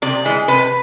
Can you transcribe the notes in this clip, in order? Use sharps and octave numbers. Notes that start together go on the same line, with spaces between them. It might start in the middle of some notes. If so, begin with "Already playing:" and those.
C3 D5
E3 G#3
C3 B4